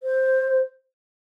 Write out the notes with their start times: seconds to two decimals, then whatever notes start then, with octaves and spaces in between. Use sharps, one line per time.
0.03 C5